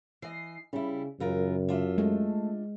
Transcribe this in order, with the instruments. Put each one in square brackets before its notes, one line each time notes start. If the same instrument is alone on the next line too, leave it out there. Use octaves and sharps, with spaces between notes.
[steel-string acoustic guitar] E3 D#5 [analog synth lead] C7
[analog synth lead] C#3 [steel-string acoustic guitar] G3 E4
[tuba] F#2 [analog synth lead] C#3 [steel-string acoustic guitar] E3 F4 A#4
[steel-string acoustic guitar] D4 F4 E5
[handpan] G#3 [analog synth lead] A3